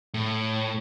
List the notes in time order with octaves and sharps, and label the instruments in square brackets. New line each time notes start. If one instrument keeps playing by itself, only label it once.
[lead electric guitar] A2